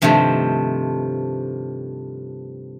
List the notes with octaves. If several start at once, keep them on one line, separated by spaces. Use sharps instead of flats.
G2 C3 D#3 F3 A3 C4